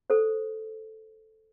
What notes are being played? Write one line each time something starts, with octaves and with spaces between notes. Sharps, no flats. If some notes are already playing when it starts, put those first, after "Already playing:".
A4 C5